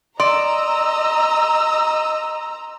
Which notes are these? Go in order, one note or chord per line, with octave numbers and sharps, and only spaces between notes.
D5 D#5 A#5 C6 E6